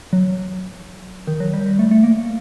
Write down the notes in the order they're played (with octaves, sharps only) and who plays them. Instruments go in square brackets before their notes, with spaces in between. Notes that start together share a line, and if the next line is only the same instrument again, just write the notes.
[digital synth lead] F#3
D#3
F#3
G3
G3
A3
A3
A#3